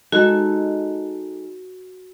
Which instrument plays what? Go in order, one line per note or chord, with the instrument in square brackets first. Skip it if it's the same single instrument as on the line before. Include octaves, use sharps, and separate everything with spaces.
[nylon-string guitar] G#3 D#4 A4 [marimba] F#4